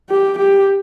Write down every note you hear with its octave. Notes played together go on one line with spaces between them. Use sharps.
G4
G4